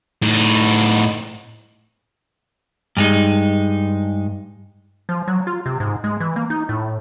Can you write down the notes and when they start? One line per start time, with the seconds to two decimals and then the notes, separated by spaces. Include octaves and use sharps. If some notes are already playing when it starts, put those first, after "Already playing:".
0.22 A2 D#4
2.97 G2 G#3 D#4
5.09 F3
5.28 F#3
5.47 F4
5.66 C3
5.80 G#2
6.04 G#3
6.20 E3
6.36 A#3
6.50 D#4
6.69 A2